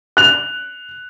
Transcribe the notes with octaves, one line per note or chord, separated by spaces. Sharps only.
F#6 F7